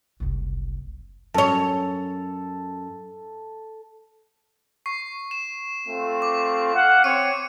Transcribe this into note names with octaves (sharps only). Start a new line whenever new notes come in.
F#1 C2
F#2 A4 C#5
C#6 C7
E7
A3 C4 F4
D6
F5 F#5
C4 C#5 C#7 D#7